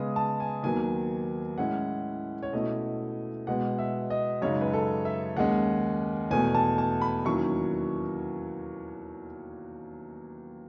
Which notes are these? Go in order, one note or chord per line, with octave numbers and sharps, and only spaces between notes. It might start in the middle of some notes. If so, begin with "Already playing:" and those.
Already playing: C#3 G#3 B3 D#6
A5
G#5
D#2 D#3 F#3 B3 G#5
A2 G#3 C#4 E4 F#5
C#5
B2 A3 C#4 E4 D#5
B2 G#3 B3 F#5
E5
D#5
F#2 C#3 G#3 D#4 C#5
B4
A4
E5
D#2 D#3 G#3 C#4 F#5
E2 B2 A3 G#5
A5
A5
B5
D#2 D#3 F#3 C#4 E4 C#6